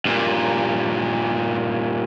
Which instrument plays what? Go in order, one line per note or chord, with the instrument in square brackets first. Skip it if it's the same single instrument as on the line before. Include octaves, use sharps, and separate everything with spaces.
[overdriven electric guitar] G2 A#2